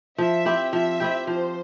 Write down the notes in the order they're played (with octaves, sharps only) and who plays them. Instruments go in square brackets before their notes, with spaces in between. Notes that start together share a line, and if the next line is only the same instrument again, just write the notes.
[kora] F3 [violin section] E5
[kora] C4 E4 G4
[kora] F3 [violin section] E5
[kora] C4 E4 G4
[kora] F3 [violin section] C5